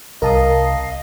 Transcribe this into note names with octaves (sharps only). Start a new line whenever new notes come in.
C2 A#4 D#5 F5 A5 D#6